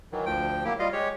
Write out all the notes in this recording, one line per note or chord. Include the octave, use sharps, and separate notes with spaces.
D#3 E3 F#3
D2 F3 G5
F#3 A#3 E4 G4
G3 F4 D#5 F5
G#3 G4 C#5